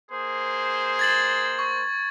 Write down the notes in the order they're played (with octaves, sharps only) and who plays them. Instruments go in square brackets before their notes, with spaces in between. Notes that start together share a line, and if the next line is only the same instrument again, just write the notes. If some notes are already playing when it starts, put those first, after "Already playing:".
[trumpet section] A#3 C5 [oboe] G#4
[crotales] G#6 A6 F#7
C#6